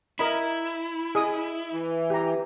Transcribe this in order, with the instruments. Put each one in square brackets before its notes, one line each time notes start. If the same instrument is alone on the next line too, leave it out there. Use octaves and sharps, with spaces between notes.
[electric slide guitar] E4 [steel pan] A#4 D#5 B5
[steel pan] G#4 D#5 D#6
[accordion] E3
[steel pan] G4 A#5